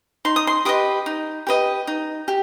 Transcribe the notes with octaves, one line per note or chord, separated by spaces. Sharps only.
D#4 C6
D#6
C6
G4 B4 D#5 D#6
D#4
G4 B4 D#5
D#4
G4